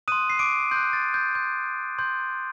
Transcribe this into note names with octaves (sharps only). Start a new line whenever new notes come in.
C6 D#6 F#6 D#7
C7
D6 D7
C6 F#6 G6
A6
G6
C6 G6
C6 G6